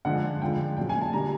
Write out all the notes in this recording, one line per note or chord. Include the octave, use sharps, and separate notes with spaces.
D3 F3 G#3 F#5
D3 F3 G#3 G5
A#2 F#3 G5
G#5
A5
D3 G3 A#5